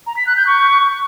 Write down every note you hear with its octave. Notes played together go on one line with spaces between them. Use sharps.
A#5
B6
F#6
G6
C#6